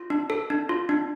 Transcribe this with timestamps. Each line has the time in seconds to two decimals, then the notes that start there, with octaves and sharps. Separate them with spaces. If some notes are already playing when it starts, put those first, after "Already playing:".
Already playing: F4
0.10 D4
0.30 A4
0.50 D4
0.69 F4
0.89 D4